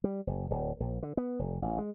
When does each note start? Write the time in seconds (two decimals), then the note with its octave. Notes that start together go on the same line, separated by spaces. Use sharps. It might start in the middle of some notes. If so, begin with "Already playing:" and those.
0.04 G3
0.27 F#1
0.50 D1
0.80 A#1
1.03 D3
1.17 B3
1.39 F1
1.62 A1
1.78 G#3